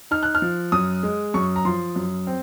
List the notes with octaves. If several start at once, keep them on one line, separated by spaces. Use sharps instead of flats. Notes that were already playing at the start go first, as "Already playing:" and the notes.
D#4 F6
F#6
F6
F3
F#2 D#6
G#3
F#2 C#6
A#5
F3 C6
F#2
C4